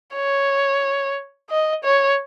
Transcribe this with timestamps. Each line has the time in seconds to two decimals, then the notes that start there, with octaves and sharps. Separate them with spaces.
0.15 C#5
1.50 D#5
1.84 C#5